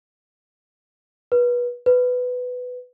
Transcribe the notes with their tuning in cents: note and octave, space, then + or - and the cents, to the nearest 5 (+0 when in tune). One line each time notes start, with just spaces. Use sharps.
B4 -25
B4 +10